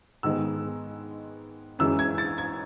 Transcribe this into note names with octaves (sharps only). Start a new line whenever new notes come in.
G#2 D#3 G#3 B3 E6
F#2 E3 G#3 E6
G#6
A6
G#6